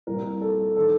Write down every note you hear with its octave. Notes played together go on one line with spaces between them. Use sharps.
C2 A#2 G3 A#4
A4
D#3 A4